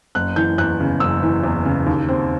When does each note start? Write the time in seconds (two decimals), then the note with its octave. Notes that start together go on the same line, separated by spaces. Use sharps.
0.15 F#1 F#6
0.36 E3 G6
0.58 E2 F#6
0.80 C#3
1.00 F#1 E6
1.23 E3
1.44 E2
1.65 C#3
1.86 D#2
2.09 C4